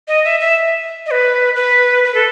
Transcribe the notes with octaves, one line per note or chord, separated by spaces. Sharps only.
D#5
E5
E5
D#5
B4
B4
B4
A4